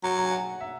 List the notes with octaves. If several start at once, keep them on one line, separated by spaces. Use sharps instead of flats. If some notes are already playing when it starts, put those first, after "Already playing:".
F#3 A#5
A#5
G#5
F#5
E5